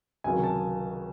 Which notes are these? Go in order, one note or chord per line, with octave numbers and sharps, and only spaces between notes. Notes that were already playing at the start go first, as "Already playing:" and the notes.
C#2 C3 D#3 F#3 G#5
A5